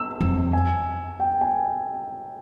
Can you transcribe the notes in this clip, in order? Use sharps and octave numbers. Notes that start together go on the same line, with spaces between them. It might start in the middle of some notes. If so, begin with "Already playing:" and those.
Already playing: E6
F2
G#5
G5
G#5